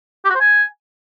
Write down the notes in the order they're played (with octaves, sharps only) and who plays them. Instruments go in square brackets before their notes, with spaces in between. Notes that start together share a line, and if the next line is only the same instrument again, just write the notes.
[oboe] G4
F#4
C5
G#5